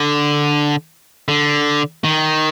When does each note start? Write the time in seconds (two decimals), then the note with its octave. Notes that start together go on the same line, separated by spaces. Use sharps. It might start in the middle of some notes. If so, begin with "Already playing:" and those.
Already playing: D3
1.28 D3
2.04 D#3